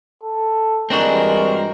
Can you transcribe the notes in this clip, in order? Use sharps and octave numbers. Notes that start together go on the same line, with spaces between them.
A4
G2 E3 G3 G#3 C4 D4 F#4 A#4